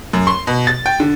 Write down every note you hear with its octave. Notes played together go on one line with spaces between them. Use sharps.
F#2
C6
B2
A6
G5
D3